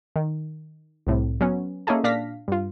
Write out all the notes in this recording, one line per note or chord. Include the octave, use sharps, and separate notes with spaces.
D#3
C2 A2 C3
F#3 B3 C#4
A#3 C#4 D#4 E4 G#4 A4
A#2 D4 F5 A#6 B6
G2 F4